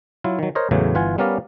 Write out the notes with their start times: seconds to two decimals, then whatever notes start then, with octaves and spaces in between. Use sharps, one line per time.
0.24 F#3 E4 F4
0.39 D#3 F#3
0.55 A#4 C5 C#5 D#5
0.71 E2 A2 C#3 E3 F#3
0.95 G1 E3 F4 F#5 G#5
1.18 G3 B3 C#4 A#4 D5 F5